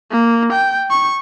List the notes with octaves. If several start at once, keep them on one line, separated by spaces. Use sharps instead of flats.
A#3
G5
C#6